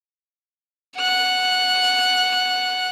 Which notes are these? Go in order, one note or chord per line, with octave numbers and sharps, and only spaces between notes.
F#5 F#6